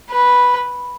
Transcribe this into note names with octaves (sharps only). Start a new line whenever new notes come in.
B4